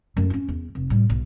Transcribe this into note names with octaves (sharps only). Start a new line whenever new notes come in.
F#2 A3
C#4 E4
E2
F1
A2 G3
B1